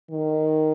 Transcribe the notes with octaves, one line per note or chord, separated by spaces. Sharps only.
D#3